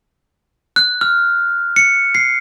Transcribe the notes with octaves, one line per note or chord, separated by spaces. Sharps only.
F#6
F6
C#7
C7